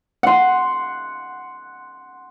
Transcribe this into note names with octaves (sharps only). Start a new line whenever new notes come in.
F#5 C6